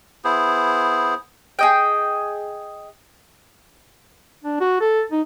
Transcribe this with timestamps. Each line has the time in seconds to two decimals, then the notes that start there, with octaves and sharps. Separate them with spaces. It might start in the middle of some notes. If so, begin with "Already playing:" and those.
0.24 B3 E4 G#4 C5
1.59 G#4 D#5 G5
4.44 D4
4.60 F#4
4.81 A4
5.11 D#4